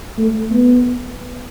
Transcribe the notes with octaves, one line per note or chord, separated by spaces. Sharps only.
A3
B3